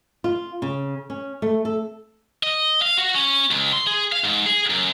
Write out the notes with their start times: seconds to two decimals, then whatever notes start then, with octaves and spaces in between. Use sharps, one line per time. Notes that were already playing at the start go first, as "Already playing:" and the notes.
0.24 F4
0.62 C#3
1.10 C#4
1.42 A3
1.65 A4
2.43 D#5
2.82 F5
2.97 F#4
3.15 C#4
3.51 C#2
3.73 C6
3.87 G#4
4.12 F5
4.24 G#2
4.46 G#4
4.70 F#2